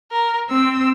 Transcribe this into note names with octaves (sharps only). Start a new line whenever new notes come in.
A#4
C4 E6